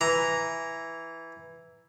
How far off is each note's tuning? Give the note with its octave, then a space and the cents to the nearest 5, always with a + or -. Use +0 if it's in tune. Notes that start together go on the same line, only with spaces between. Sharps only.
E3 +0 A#5 +0